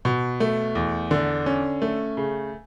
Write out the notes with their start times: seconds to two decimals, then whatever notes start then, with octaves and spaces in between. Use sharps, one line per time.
0.05 B2
0.40 A3
0.75 E2
1.11 D3
1.46 C#4
1.82 A3
2.17 C#3